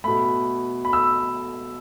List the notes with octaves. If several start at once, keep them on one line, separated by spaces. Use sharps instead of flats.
B2 A3 B5
B5
E6